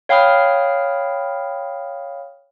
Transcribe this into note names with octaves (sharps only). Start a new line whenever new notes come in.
C#5 F5 G5 B5 D#6 F6